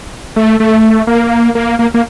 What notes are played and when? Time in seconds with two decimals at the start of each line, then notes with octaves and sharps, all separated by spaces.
0.36 A3
0.60 A3
1.07 A#3
1.55 A#3
1.79 A#3
1.94 A#3